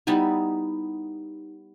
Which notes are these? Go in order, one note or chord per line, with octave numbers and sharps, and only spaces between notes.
G3 B3 D#4 E4